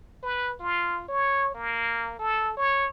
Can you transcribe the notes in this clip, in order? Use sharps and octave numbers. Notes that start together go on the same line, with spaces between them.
B4
F4
C#5
A#3
A4
C#5